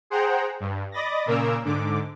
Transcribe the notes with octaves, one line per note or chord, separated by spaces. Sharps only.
G#4 C5 F#5 G5 A#5
G2
D5 D#5 B5 A6 A#6
A#2 C#3 A#3 A#4 D6 E6
G#2 D3 D6